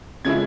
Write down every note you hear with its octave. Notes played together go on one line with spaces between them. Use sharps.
C#3 F3 G#3 C#4 E4 G#6